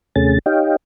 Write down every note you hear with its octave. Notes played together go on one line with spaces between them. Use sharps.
D#2 C3 A3 C#4 G#4 A6
D#4 G4 C#5 D#5 F5 G5